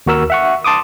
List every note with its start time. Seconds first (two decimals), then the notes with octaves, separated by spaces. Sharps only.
0.06 D#2 F#4 A#4 E6
0.30 E5 F#5 C#6
0.64 A5 C6 D6 D#6